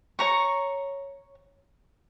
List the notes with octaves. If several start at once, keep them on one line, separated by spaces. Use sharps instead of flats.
C#5 A#5 C#6